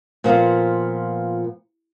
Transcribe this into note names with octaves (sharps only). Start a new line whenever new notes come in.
A#2 F3 B3 F5